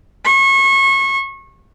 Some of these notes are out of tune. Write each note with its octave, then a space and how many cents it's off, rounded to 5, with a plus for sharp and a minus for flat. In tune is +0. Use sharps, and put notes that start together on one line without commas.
C#6 -30